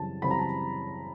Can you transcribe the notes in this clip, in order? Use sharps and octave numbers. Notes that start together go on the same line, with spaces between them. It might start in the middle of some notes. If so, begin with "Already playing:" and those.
Already playing: F#2 C#3 E3 G3 C4 A5
F#2 C#3 E3 G3 C4 B5
A#5
A5